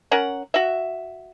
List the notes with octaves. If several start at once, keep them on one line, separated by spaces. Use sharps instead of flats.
C#4 A#4 F#5
F#4 E5